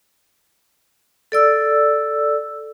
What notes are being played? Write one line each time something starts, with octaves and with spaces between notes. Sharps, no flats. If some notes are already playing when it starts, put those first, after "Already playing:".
A4 D5 E6